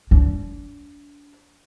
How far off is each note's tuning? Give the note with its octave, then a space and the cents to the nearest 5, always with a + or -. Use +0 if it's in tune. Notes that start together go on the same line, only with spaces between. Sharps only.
D4 -35